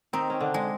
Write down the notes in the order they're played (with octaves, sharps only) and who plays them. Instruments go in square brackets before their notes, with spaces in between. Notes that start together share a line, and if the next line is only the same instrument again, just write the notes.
[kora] D#3 D#4 [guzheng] C4
[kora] C#4
D3 D4
[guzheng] G#3